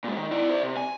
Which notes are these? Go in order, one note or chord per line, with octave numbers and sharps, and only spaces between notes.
A#2 G#3
D#3
E4 D5
C5 D5
C3
G#5